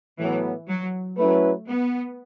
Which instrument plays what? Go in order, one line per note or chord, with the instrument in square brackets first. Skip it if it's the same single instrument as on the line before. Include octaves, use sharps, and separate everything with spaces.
[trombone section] A2 F#3 B3 [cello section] E3
[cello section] F#3
[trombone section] F#3 C#4 E4 B4 [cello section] A3
[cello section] B3